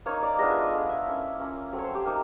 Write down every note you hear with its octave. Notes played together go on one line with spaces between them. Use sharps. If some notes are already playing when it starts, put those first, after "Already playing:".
A#3 D#4 C#5
D5
G#3 B3 D4 F4 D#5
E5
D#5
A3 D4 F4
E5
A#3 C#4 E4
A#3 C#4 F4
F#3 A3 C4
C#5
C5
G4
A#3 D#4